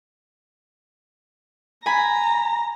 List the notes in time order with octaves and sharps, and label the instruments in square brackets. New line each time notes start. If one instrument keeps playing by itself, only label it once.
[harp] G#5 B5 [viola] A#5